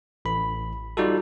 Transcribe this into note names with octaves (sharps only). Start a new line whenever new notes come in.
A1 B5
G3 D#4 F4 F#4 A4